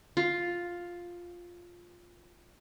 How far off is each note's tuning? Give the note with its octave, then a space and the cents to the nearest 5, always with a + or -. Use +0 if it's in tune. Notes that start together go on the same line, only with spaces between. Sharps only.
F4 +5